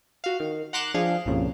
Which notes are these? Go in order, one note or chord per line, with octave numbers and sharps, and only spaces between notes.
F#4 F5
D#3
F#5 A#5 C6 D6 F#6 E7
F3 D4 G#4 F5
C2 G2 A#2 C#3 F3